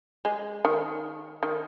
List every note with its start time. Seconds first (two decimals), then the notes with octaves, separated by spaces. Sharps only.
0.25 G#3
0.65 D#3
1.43 D#3